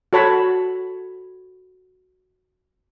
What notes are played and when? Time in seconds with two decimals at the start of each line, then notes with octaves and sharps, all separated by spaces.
0.13 F#4 A4 C#5 A5 B5